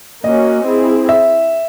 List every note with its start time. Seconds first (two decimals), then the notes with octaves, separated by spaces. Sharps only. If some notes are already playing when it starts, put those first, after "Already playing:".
0.24 A#3 C#4 F#4 D#5
0.66 C4 E4 G#4
1.09 E5